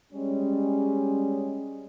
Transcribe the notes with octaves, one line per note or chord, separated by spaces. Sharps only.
G3 G#3 C#4